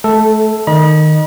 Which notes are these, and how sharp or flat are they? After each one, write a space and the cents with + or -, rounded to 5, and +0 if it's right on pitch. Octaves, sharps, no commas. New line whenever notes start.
A3 -30 A4 +0
D#3 -10 D#5 -15 B5 -45